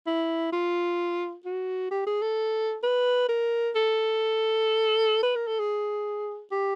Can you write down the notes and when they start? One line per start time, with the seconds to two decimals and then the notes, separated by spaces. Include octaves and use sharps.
0.07 E4
0.52 F4
1.45 F#4
1.91 G4
2.07 G#4
2.22 A4
2.83 B4
3.29 A#4
3.75 A4
5.23 B4
5.36 A#4
5.47 A4
5.60 G#4
6.52 G4